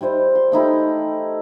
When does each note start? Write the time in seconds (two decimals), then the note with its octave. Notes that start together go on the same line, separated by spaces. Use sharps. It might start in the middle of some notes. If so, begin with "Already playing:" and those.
0.01 G3 E4 C5 D#5
0.35 C6
0.52 A3 D#4 E4 G4